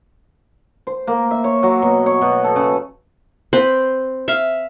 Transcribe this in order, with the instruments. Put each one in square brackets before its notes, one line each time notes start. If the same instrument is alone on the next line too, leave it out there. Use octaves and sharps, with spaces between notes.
[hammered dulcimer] C5
A#3
E5
C#5
F#3
B2
C#5
B2
A4
C#3
[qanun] C4 B4 C5
E5 F5